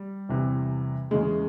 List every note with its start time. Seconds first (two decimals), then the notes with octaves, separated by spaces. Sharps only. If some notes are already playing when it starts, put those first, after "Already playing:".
Already playing: G3
0.29 E2 C3 E3
1.11 E2 C#3 E3 G#3